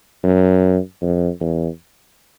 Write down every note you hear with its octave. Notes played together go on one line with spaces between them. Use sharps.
F#2
F2
E2